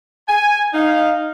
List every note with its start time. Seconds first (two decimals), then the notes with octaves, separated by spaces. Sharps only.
0.29 G#5
0.74 D#4 F5